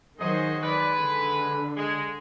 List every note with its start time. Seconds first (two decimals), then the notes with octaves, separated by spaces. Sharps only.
0.20 D#3 F#3 F#4 G#4 C5 D#5
0.63 G#3 B4 D5
0.99 D3
1.77 G#3